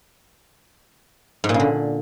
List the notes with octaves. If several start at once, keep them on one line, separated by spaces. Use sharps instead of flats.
G#2
A#2
C#3
D3